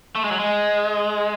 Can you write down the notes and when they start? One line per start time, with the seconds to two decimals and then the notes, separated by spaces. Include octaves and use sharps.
0.15 A3
0.24 G#3
0.31 F#3
0.40 G#3